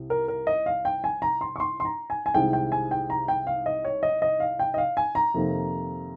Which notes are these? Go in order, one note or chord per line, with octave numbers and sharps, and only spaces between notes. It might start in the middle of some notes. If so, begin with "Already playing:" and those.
Already playing: C2 C3
A#4
A#4
D#5
F5
G5
G#5
A#5
C6
C#6
C6
C6
A#5
G#5
G#5
C2 C3 D#3 G#3 C4 G5
G5
G#5
G5
A#5
G5
F5
D#5
C#5
D#5
D#5
F5
G5
D#5
F5
G#5
A#5
F2 C3 D#3 A#3